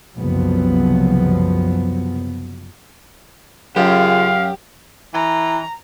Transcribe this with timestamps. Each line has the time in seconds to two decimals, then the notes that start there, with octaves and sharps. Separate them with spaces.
0.16 F#1 C2 F3 F#3 B3
3.76 F#2 C#3 F4 G4 F5
5.14 E3 A#5